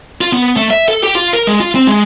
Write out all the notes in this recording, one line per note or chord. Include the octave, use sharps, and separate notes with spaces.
F4
B3
A3
E5
A4
G4
F4
A#4
G#3
F4
C4
G#3